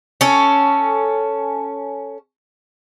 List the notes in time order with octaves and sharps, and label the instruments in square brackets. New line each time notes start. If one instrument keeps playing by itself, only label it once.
[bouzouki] C#4 A4